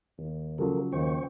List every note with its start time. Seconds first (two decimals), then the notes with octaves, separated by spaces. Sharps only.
0.18 D#2
0.58 C#3 F3 F#3 G4 A4 A#4
0.93 D#2 C5 G5 C#6